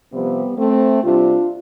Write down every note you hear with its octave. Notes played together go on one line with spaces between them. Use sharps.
C3 F3 G3 B3
A3 C4
C3 G3 D4 F4